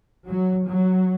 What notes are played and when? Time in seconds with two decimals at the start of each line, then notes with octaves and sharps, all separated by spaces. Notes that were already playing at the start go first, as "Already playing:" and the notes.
0.27 F#3
0.66 F#3